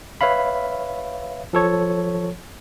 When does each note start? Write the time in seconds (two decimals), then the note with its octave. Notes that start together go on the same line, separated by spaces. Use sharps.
0.21 B4 C#5 E5 F5 B5
1.53 F3 A4 C#5